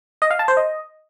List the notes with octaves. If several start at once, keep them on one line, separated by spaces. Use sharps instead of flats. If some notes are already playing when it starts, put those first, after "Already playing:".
D#5
F5
A5
C5
D#5